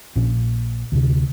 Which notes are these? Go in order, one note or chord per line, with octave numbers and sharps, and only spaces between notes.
A#1 A#2 C#4
D2 C3